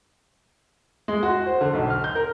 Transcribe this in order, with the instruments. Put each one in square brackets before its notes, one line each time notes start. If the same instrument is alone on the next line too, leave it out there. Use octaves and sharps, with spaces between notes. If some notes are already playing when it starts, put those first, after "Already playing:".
[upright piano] G#3
F#4
C5
D3
B1
F6
G6
A#4